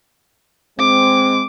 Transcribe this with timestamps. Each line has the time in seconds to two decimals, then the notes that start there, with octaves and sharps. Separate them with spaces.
0.79 G#3 C4 D6